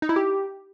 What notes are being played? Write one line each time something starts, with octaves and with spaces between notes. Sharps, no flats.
D#4
E4
G4